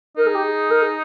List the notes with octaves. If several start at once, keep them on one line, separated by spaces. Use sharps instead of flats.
D#4 A#4
G#4
G4
G#4
A#4
G#4